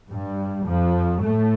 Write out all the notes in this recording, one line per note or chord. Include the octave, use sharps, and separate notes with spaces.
G2 G3
F2 F3
A2 A3